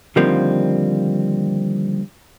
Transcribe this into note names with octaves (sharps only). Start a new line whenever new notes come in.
D3 D#3 F3 G3 A#3 C4